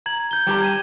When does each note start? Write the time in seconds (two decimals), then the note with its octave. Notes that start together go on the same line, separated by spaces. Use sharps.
0.06 A#5 G#6 F#7
0.31 G6 G7
0.47 G3 G4 A#5
0.62 G#6 D#7 E7